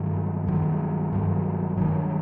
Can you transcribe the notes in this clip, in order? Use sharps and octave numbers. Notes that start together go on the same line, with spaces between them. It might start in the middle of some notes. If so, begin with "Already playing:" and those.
Already playing: G2 D#3 F#3
G2 D#3 F#3
G2 D#3 F#3
G2 D#3 F#3